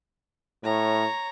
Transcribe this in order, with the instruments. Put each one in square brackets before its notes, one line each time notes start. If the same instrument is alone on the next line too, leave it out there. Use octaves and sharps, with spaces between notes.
[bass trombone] A2 [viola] C#5 A#5